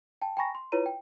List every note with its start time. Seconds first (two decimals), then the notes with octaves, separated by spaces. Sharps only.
0.22 G5 A5
0.37 G5 G#5 A#5 B5 C#6 A#6
0.55 C6
0.72 E4 F4 B4 C#5 A#5 D#7
0.86 G5